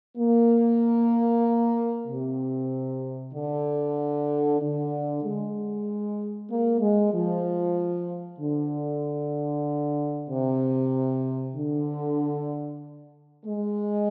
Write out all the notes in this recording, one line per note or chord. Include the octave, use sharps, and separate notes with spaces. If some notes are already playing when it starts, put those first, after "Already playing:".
A#3
C3
D3
D3
G#3
A#3
G#3
F3
D3
C3
D3
G#3